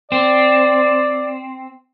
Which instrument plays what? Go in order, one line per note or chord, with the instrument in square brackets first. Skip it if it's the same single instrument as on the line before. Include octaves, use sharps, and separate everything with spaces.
[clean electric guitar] C4 [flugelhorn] D5